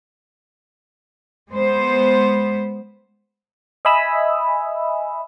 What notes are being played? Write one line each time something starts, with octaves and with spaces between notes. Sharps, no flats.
G#3 B3 C5
D#5 E5 G#5 B5 D#6 E6